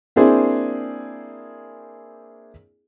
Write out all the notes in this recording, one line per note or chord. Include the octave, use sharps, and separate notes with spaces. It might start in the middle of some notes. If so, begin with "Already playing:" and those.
A#3 C4 D4 E4 G#4 C5